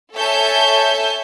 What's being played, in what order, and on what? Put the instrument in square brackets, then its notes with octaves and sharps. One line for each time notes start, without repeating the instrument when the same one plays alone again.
[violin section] A4 C#5 E5 G#5 A5 G6